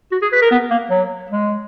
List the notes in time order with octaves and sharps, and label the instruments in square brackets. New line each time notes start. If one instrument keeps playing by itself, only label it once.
[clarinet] F#4
G#4
B4
A#4
B3
A#3
F#3
G#3